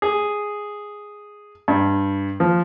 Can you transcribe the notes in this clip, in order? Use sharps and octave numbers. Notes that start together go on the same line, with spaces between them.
G#4
G2
F3